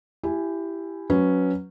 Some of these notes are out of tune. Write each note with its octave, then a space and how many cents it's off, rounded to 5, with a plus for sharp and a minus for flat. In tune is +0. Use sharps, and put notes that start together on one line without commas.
E4 +15 G4 +0 G#5 +0
F#3 -5 C#4 +0 B4 +0